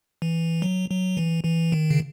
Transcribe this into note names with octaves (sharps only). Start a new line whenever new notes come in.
E3
F#3
F#3
E3
E3
D#3
C#3